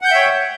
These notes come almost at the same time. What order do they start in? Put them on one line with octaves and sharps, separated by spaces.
F#5 G6 G5 E5 C#5